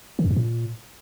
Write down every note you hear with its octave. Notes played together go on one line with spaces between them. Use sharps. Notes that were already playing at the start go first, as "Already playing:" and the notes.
D#3
F2
G2
A#2